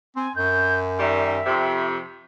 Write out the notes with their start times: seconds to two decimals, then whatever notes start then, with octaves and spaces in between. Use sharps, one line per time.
0.16 C4 G#5
0.36 F#2 G6
0.99 D#3 G3 E5
1.46 F2 C3